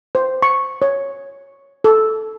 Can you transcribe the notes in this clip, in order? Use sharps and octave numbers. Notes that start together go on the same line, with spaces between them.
C5
C#6
C#5
A4